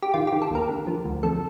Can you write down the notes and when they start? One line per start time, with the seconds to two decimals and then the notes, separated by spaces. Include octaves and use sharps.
0.02 G4
0.14 D#3 F4
0.27 G4
0.33 D#3
0.42 A4
0.51 D#2 A#4
0.69 D3
0.87 F3
1.05 D2
1.23 F2 A4